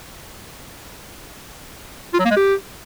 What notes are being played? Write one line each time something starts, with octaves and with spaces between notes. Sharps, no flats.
F4
F#3
A#3
G#3
G4